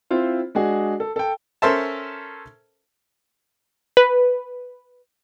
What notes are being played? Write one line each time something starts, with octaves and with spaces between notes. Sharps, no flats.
C4 E4 F4 C5
G#3 D4 F#4 G#4
A4
A4 G5
C#4 A4 A#4 C5 E5 A5
B4